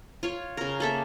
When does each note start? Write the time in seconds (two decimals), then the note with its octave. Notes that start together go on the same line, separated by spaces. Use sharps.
0.23 F4 C#5
0.57 C#3 A#4
0.80 A#3 A4 E5